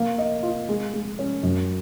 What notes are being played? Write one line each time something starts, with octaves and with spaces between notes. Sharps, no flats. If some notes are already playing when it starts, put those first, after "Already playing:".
Already playing: A#3
D#5
F4
G#3
G#3
C#4
F#2